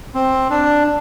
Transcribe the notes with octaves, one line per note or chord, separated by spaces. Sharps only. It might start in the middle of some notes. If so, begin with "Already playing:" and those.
C4
D4